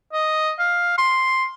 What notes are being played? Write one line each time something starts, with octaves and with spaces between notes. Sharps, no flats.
D#5
F5
C6